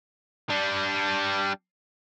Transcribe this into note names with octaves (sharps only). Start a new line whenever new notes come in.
G3 D4